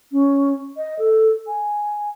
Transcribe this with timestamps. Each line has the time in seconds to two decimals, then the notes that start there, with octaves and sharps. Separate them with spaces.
0.12 C#4
0.77 D#5
0.99 A4
1.47 G#5